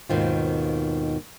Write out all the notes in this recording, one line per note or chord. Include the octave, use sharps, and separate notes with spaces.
D#2 G#2 B2 D#3 C4 F4